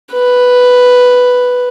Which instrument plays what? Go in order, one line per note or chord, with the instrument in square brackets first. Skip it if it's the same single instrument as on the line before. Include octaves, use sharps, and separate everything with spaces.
[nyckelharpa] B4